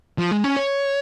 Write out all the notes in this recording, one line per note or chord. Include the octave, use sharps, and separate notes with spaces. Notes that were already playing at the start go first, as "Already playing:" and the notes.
F3
G#3
C#4
C#5